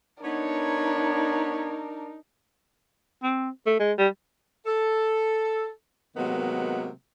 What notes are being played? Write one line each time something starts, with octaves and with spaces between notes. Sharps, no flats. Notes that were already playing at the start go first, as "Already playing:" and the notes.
B3 D4 D#4 A#4 C#5
C4
A3
G#3
G3
A4
C3 D#3 F#3 G#3 A#3 B3